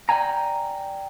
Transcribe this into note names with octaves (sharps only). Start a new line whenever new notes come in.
D5 E5 G5 G#5 A#5